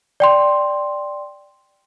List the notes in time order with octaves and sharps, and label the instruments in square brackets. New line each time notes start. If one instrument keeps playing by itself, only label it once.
[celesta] D5 G5 C6